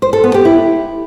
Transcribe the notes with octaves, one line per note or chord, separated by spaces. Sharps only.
C5
A4
B3
G4
E4